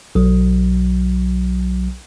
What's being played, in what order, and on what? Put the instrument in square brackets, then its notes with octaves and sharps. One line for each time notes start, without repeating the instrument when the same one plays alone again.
[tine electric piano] B1 F#3